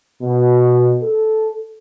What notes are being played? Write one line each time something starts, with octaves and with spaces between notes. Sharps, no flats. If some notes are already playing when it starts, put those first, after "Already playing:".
B2
A4